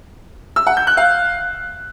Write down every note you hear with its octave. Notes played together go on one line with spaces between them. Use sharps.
E6
F#5
G6
F#6
F5